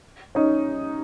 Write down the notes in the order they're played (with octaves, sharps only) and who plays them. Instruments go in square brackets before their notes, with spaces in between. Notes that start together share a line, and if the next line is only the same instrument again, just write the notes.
[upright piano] C#4 D#4